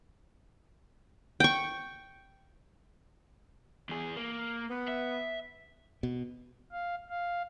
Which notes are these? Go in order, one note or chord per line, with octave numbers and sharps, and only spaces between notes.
G5 C#6
E2 G#4
A#3
B3
E5
B2
F5
F5